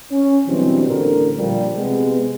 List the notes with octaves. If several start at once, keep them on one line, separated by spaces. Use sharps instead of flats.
C#4
B2 D3 E3 F#3 G3 C4
A1 D3 A#4
A#2 F3 G3
C3 G#3 B3